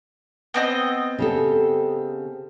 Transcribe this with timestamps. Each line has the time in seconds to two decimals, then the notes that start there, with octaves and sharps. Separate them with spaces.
0.54 B3 C4 D#5
1.18 C#3 G4 A4